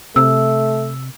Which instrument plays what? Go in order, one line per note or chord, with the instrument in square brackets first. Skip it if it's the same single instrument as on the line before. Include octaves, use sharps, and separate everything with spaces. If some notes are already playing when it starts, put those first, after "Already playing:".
[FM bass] C3 [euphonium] A3 [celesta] E6